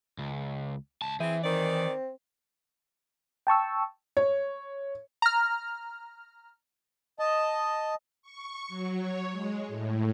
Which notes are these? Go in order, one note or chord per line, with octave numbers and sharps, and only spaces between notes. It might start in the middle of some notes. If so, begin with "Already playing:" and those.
C#2
C#2 A5
E3 C4 E4 G#4
D#3 C4 D5
G5 A5 C#6 E6
C#5
A#5 F6
D#5 A5
C#6
F#3
C#5
G#3
A2